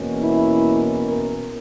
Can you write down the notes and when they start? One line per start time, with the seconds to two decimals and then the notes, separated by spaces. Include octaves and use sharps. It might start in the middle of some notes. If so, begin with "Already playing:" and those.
Already playing: E2 B2 A#3 C#4
0.21 E4
1.08 A#4